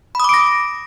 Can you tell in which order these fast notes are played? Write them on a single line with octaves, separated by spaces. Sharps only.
B5 D#6 D6 D7 A#6